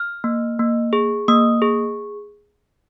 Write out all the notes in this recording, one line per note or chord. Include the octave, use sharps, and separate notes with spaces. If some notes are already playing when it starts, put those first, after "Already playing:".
Already playing: F6
A#3
A#3
G#4
A#3 D#6
G#4